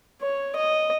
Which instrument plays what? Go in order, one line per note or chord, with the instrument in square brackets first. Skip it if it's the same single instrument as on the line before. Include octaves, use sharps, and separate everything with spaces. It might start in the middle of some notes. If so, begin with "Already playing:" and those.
[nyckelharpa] C#5
D#5